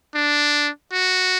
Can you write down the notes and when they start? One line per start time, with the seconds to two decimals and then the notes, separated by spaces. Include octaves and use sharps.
0.15 D4
0.93 F#4